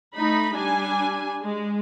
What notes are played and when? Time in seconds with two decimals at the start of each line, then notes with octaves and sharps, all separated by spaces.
0.14 A3 D#4 B5
0.55 G3 D4 G#5
1.42 G#3